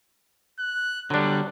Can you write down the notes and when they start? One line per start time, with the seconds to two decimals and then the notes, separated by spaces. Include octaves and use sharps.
0.59 F#6
1.10 D3 F#3 G3 D4 F#6